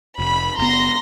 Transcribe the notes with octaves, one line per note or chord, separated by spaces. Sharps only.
F1 B5
F#1 B3 A#5 C6 A#6